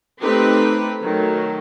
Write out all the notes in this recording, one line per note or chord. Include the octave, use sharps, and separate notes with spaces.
A3 C4 D#4 G4 B4
D#3 F#3 A3